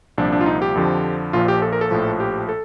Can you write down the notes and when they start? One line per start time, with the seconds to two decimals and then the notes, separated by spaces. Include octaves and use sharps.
0.18 C2 A#2 F3 D4
0.32 D4
0.41 F4
0.46 D#4
0.62 G4
0.75 F2 D3 F3
1.33 A#1 A#2 F3 F4
1.48 G4
1.62 A4
1.73 A#4
1.81 A4
1.91 A#1 A2 F3
2.20 G4
2.49 A4